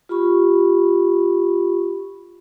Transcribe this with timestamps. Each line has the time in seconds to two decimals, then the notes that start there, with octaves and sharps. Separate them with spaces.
0.09 F4 G4 B5 C#6